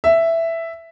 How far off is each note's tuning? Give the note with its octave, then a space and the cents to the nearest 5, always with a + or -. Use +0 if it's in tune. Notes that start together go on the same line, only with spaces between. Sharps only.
E5 +5